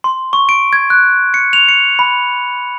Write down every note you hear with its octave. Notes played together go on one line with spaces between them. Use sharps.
C6
C#6
D7
G#6
F#6
C#7
F7
C#7
B5